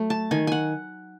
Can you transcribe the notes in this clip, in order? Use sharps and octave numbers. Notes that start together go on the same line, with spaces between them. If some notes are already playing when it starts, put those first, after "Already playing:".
Already playing: F#3 A3
A5
D#3 G#5
F#5 G#5